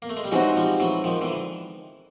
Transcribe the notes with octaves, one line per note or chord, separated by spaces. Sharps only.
A#3
A3
G#3
G3
E3 F#3 G#3 C4 D#4 F#4
F3 G3
E3 F#3
D#3 F3
D3 E3